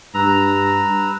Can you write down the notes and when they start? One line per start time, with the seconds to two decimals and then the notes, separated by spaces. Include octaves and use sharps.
0.15 G2 B4 A#5 E6